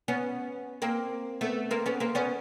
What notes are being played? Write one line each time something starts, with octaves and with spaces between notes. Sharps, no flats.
B3 C#4
A#3 C4
A3 B3
A#3 C4
B3 C#4
A#3 C4
B3 C#4